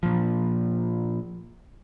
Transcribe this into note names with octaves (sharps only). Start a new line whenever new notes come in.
A#2 F3